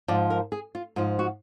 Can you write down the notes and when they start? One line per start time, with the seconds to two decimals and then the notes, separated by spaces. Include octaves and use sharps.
0.08 G#2 F3 D5
0.30 A#4
0.52 G#4
0.75 F4
0.96 G#2 F3 F4
1.19 F#4